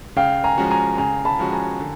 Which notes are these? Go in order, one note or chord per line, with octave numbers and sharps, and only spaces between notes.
C#3 F5 G5
G#5 A#5
F3 G#3 C#4 F#4
G#5 A#5
C#3 G#5 A#5
A5 B5
F3 G#3 C#4 F#4
G#5 A#5
D3